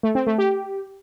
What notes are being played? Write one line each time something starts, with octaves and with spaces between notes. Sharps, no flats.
A3
C4
A3
G4